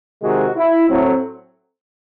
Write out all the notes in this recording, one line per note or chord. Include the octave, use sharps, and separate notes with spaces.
C3 D#3 G#3 F#4
E4
A2 F#3 A3 C4